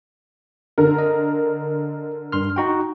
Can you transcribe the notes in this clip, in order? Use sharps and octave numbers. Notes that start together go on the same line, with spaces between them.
D3 A#4
D#5
G2 C6 F6
D#4 F#4 G5